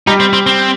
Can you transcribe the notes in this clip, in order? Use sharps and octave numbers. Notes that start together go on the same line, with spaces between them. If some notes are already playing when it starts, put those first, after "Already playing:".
G3 D#4 G4
C4
C4
C4